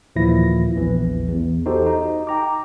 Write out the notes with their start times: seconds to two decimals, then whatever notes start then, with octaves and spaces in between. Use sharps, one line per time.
0.16 D#2 A#2 E3 F3 E4 A#6
0.75 A#1 E2 E3
1.29 E2
1.66 D#4 F#4 G4 A4 C5
1.86 D#4
2.27 G5 A#5 D6